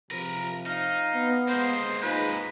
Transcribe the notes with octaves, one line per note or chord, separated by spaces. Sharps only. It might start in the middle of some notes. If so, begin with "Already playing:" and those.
C3 F3 A#4 B4
D#4 F5
B3
G#3 A#3 C5
D#4 F4 G#4 B4